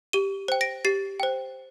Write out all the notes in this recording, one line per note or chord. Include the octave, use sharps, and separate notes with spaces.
G4 D#7 G7
C5 G5
A#6 D7
G4 A6 C7
C5 G5